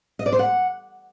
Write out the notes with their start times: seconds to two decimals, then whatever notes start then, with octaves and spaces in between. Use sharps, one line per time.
0.19 D#5
0.26 D5
0.32 C5
0.39 F#5